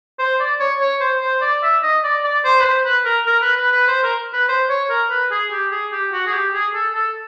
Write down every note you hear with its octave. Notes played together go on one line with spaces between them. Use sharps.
C5
D5
C#5
C#5
C5
C5
D5
E5
D#5
D5
D5
C5
B4
C5
B4
A#4
A#4
B4
B4
B4
C5
A#4
B4
C5
C#5
A#4
B4
G#4
G4
G#4
G4
F#4
G#4
G4
G#4
A4
A4